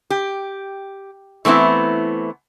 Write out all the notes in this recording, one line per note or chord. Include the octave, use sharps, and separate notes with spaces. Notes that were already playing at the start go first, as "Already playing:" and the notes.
G4
E3 A3 B3 C4 E4